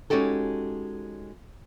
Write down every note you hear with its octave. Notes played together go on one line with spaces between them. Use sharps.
G#3 C#4 D#4 F#4 G4 A4